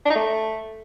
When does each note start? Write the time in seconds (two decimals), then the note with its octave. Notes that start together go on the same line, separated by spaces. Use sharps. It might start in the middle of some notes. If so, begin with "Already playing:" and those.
0.05 D4
0.11 D#4
0.16 A3